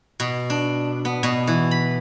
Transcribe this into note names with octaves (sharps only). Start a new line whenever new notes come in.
B2
D4
B3
B2
E3
B5